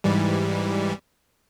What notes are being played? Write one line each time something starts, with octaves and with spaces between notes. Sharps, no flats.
G#2 E3 G3